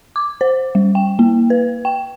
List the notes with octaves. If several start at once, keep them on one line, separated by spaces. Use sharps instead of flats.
D6
C5
G3
G5
A#3
B4
G5